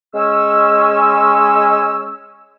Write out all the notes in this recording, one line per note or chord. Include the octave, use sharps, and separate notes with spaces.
G#3 C#4 E6